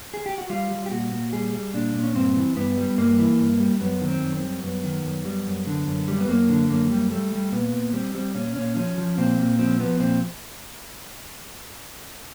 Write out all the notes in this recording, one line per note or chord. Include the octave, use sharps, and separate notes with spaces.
G#4
G4
F#4
G3 F4
G3
G4
A#2 F#4
A#2
G3 G#4
G3
A#2 D4
A#2
C#4
G2 C4
E3
G2 B3
G3
G2 A#3
E3
G2
G3
F#2 B3
D#3
C4
F#2
C4
G3
F#2 B3
D#3
F#2
G3
F#2
D3
F#2
G3
B3
F#2 A#3
D3
F#2 A#3
G3
G3 A3
G3
A#2 B3
A#2
G3 C4
G3 C4
A#2 C#4
A#2 C#4
F3 C#4
F3
A#2 C4
A#2
F3 C4
F3 B3
A#2 C4